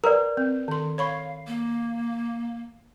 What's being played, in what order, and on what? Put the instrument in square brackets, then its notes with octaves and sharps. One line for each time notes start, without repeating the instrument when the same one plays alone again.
[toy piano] A#4 B4 D5 [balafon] A#5
[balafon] C4
D#3 C6
[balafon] C#5 B5 C#6 [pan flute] F5
[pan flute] A#3